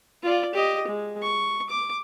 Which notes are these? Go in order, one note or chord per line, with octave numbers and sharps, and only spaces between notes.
F4 D5
G4 D#5
G#3
C#6
D6